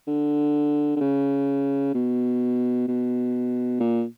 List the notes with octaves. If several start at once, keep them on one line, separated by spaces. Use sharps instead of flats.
D3
D3
C#3
B2
B2
A#2